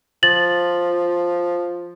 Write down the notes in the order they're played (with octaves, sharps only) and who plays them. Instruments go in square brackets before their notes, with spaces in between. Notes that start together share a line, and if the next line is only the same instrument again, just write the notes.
[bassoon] F3 [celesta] A6 F#7